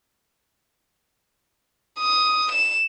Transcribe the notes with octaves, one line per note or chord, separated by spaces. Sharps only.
D#6
E7